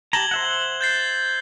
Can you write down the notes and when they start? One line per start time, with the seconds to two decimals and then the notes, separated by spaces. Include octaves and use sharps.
0.13 G4 A5 A#5 G#6 F#7 G7
0.31 C5 E5 F#5
0.81 G6 A6 C7